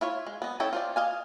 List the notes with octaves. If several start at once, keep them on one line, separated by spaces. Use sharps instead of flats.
E4 F4 C#5
G#3
B3 D#5
C#4 E4 A4 D#5 G5
F4 C5 D5
D#5 F5 G#5